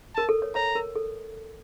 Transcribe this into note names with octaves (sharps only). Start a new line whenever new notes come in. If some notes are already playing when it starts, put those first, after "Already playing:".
A#4 A5
A4
C#5
C#5 A#5
A#4
A4